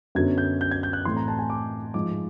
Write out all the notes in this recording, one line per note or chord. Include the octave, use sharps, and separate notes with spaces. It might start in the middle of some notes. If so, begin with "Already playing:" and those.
F#2 D3 F#3 B3 G#6
G6
G6
G#6
G6
F#6
A2 E3 A3 C4 C6
A#5
A5
G#5
D6
G#2 F3 G#3 D6